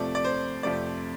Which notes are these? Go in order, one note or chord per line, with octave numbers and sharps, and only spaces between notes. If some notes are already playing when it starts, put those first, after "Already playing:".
Already playing: F2 C3 F3 A3 D5
D5
C5
F2 C3 F3 A3 D5